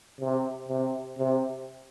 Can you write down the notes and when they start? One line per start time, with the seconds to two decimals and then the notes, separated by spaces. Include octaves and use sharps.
0.20 C3
0.68 C3
1.18 C3